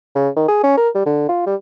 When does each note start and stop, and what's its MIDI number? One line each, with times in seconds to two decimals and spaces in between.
0.15 0.29 49
0.37 0.47 51
0.48 0.62 68
0.63 0.73 61
0.77 0.89 70
0.95 1.04 55
1.06 1.24 50
1.29 1.46 65
1.47 1.55 55